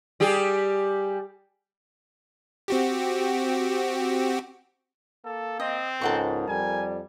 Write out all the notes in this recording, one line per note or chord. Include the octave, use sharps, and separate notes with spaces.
G3 G4 G#4
C4 F#4 G4
A#3 A4
C4 D#5
C#2 G#2 A4 A#4 F#5 C#6
F2 G3 G#5